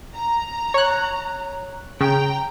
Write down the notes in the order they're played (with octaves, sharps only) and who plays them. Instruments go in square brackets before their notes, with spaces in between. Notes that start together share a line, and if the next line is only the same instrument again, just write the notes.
[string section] A#5
[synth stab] C#5 F#6
[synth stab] C#3 [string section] G5 A#5